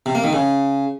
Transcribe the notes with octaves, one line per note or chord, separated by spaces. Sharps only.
C3
A#3
D#3
C#3